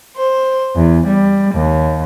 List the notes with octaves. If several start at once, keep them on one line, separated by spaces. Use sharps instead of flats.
C5
E2
G3
D#2